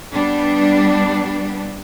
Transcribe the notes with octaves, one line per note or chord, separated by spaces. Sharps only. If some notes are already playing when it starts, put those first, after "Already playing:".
G3 B3 D4